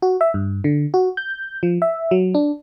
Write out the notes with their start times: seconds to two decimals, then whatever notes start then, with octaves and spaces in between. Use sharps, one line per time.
0.02 F#4
0.21 E5
0.34 G2
0.64 D3
0.94 F#4
1.17 G6
1.63 F3
1.82 E5
2.11 F#3
2.35 D4